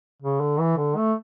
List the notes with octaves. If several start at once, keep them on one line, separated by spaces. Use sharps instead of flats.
C#3
D3
E3
D3
A3